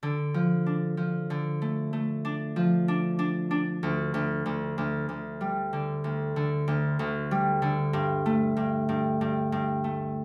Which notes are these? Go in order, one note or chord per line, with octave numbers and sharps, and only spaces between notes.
D3
F3
D4
F3
D3
A3
A3
D4
F3
D4
D4
D4
D2
D2
D2
D2
D2
G3
D3
D2
D3
D2
D2
G3
D3
G2
A3
G2
G2
G2
G2
A3